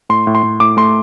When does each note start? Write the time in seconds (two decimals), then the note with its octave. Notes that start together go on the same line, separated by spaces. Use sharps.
0.09 A2 C6
0.27 A2
0.35 C6
0.43 A2
0.60 A2 D6
0.77 A3 C6